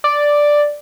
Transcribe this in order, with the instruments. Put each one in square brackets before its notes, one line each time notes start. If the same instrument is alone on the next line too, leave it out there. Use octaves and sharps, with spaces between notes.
[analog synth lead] D5